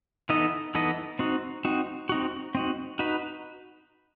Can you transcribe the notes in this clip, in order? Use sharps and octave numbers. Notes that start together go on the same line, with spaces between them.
E3 B3 D#4 A4 D#5
E3 B3 D#4 A4 D#5
C4 D#4 F#4
C4 D#4 F#4
C4 D#4 F#4
C4 D#4 F#4
D#4 F#4 B4